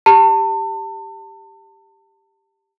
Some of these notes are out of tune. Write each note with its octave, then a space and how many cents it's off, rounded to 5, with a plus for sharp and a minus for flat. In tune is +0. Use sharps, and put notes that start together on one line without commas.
G4 +5 A5 +35